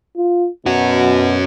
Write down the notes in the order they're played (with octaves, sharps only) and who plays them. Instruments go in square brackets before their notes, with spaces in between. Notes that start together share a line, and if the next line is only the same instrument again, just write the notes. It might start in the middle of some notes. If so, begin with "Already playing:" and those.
[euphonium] F4
[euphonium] B2 [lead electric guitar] C#4 F#4